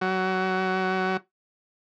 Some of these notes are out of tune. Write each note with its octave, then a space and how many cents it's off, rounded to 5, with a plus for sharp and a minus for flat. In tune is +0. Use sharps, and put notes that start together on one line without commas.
F#3 +20